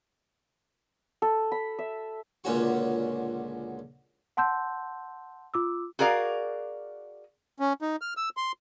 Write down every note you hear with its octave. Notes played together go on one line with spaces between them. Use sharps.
A4
B5
E5
C#2 A#2 D3 C#4 F#4 C#6
F#5 A5 C6 E6 G6
F4 D6 E6
F#4 G#4 A#4 D5 F5
C#4
D#4
F6
E6
C6